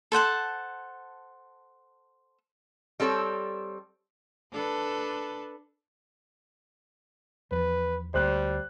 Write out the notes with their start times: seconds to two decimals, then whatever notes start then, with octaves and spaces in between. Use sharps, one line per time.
0.12 A4 C5 F#5 A5
3.00 G3 C4 A4 C#5
4.51 D4 A4 B4
7.51 E2 F3 B4
8.14 D2 G3 A#3 C5 F#6